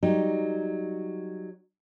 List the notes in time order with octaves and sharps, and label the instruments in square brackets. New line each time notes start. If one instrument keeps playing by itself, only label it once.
[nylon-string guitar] F#3 G3 D#4